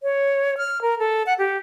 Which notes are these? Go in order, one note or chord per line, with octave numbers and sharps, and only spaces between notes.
C#5
F6
A#4
A4
F#5
G4